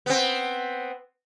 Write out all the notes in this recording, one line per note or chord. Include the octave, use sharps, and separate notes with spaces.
B3 C4